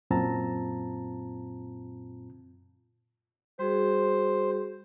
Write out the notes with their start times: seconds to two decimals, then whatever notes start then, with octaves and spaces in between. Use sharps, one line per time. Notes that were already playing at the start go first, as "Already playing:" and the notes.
0.11 F#2 A#2 C4 F4 A5 A#5
3.59 G3 F#4 G#4 C5